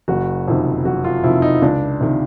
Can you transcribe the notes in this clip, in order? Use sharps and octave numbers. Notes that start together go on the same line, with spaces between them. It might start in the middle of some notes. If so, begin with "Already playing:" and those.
F#1 F#4
F2 C3 D#3
F#1 F#4
F4
F2 C3 D#3 E4
D#4
C#2 D4
C3 D#3